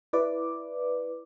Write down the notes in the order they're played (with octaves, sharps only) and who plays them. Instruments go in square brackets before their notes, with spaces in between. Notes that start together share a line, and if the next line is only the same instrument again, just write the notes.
[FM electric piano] E4 B4 D5 D6